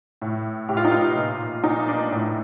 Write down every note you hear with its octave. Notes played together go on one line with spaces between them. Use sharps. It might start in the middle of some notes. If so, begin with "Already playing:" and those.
A2
A2 G4
F4
D#4
F4
A#2
A#2 D#4
D4
A2